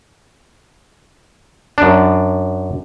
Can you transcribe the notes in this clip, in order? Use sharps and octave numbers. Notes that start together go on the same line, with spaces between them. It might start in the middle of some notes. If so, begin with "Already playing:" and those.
F#2 D4